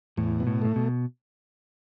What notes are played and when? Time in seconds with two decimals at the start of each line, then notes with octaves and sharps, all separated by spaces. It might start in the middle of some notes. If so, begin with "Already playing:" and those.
0.17 E2 A2
0.40 B2
0.47 A2
0.62 A2 A3
0.76 B2